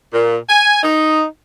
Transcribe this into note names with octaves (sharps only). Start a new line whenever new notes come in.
A#2
G#5
D#4